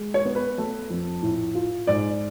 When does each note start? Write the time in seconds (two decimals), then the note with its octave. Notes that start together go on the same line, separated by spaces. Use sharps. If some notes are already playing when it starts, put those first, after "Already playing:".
Already playing: G#3
0.14 C#5
0.25 B3
0.35 B4
0.58 A3
0.90 F2
1.22 A2
1.55 F4
1.87 G#2 D5